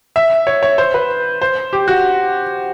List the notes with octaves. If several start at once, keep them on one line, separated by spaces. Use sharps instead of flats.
E5
C#5
C#5
C5
B4
C5
G4
F#4